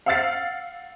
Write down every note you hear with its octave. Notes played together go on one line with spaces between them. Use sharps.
F5 F#5 E6 F6 A6 C7